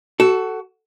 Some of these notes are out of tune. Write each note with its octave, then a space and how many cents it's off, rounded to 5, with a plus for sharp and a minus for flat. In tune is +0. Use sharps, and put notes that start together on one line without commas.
F#4 +20 A4 +0